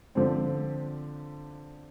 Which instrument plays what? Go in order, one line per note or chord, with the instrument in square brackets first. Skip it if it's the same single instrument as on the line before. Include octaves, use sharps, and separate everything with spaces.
[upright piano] D3 F3 C4